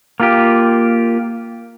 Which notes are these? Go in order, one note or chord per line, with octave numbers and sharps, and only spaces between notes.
A#3 F4 G4